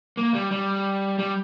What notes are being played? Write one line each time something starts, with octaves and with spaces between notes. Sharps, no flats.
A#3
G3
G3
G3